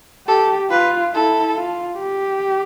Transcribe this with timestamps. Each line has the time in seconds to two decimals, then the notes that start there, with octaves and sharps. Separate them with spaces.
0.27 G4 A4
0.70 F4 B4
1.14 E4 A4
1.56 F4
1.99 G4